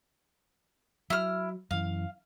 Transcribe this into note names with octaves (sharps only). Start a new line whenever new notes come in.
F#3 E4 F6
F#2 E3 F5